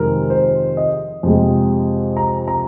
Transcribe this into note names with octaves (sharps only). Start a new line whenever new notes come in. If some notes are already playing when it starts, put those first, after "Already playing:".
Already playing: F2 C3 D#3 G#3 A#4
C5
D#5
F2 C3 G#3
A#5
A#5